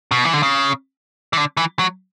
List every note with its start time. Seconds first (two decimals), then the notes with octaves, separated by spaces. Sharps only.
0.11 B2
0.24 E3
0.34 D3
0.43 C#3
1.33 E3
1.37 D3
1.57 E3
1.79 F#3